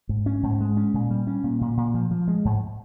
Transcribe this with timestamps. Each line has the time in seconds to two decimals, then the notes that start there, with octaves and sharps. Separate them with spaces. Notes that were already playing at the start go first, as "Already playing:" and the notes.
0.09 G#2
0.26 C#4
0.43 G#2
0.60 G#3
0.77 C#4
0.94 A#2
1.10 G3
1.27 C#4
1.44 A#2
1.61 A#2
1.77 A#2
1.94 F3
2.11 F3
2.28 G#3
2.45 G#2